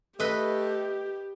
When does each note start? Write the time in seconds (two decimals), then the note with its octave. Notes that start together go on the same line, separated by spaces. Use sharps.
0.20 A3 G4 B4 D#5